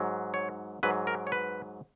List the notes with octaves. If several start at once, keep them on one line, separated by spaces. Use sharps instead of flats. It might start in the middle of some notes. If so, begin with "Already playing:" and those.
Already playing: G#2 F#3
C#5
G#2 F#3 B4
A#4
C#5
B4